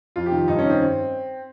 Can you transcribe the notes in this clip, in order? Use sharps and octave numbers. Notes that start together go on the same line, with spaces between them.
F2 F4
G4
D#3
G2 D#4
C#4
D#3
C4